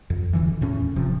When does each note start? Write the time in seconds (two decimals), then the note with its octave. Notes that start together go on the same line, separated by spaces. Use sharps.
0.10 F2
0.33 D1 D3 E3
0.61 E2 A2 C#4
0.96 E1 C3 F3